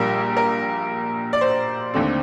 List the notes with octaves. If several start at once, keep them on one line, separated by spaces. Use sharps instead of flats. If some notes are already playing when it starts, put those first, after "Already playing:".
Already playing: A#1 A#2 G3 A#3 A#4
A#4
D5
C5
D#2 D3 A3 C4